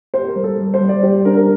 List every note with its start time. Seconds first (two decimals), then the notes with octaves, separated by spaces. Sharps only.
0.14 G4 C5
0.28 A#4
0.36 G3
0.44 A4
0.59 G3
0.74 C5
0.81 G3
0.89 D5
1.03 G4 C5
1.25 D4 A#4
1.37 A#4